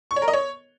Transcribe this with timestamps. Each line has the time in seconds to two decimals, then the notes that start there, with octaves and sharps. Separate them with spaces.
0.11 C#6
0.16 C#5
0.22 A#4
0.28 D#5
0.33 C#5